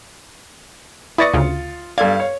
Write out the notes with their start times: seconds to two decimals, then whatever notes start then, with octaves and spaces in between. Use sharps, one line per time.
1.18 E4 B4 D5 C#6 D#6 A6 A#6 C#7
1.34 D2 C#3 F4
1.98 G2 A4 D5 F5 G#6
2.20 C#5